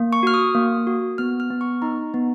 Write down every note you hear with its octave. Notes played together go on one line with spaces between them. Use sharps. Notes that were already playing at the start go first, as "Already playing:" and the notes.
Already playing: A#3
C#6
F#4 F6
D#6
A#3
F#4
B3 F6
F6
B3
C#6
D#4 A#5
B3